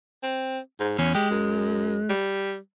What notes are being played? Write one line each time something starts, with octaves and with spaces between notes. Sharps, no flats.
C4
G#2
E2 C#4
G#3 G4
F#2
G3